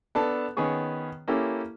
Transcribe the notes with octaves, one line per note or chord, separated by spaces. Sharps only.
B3 D4 A4 A5
D#3 B3 C#4 G#4 C#6
A#3 C#4 E4 G4 A4